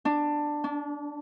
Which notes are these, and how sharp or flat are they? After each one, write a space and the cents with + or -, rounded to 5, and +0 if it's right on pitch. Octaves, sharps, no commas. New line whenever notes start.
D4 +10
D4 -30